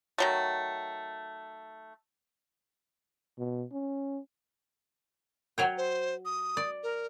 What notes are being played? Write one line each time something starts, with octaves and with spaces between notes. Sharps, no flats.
D#3 F#3 A3
B2
C#4
F#3 C#5 G5
C5
D#6
D5
A#4